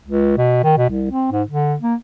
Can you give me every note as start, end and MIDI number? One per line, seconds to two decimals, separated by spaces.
0.06 0.34 37
0.38 0.63 47
0.64 0.76 51
0.77 0.89 47
0.90 1.06 36
1.10 1.29 60
1.31 1.42 44
1.48 1.75 50
1.82 1.95 58